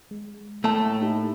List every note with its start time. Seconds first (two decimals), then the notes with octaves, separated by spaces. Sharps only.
0.11 G#3
0.64 A2 A3 A#3 A5
1.02 D#4 G4